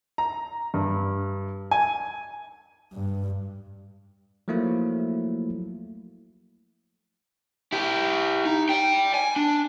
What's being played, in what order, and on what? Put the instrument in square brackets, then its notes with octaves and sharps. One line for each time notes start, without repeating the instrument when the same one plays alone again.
[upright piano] A#5
G2
G#5
[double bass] G2
[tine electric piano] F3 F#3 A3 A#3 E4
[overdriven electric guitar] E4 G4
D#4
D5 G5
G#5
D4